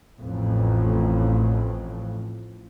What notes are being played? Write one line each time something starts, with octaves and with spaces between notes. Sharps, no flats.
A1 F2 A2